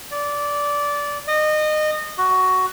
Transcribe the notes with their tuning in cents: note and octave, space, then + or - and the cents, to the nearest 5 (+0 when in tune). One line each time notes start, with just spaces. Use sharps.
D5 -15
D#5 -25
F#4 +10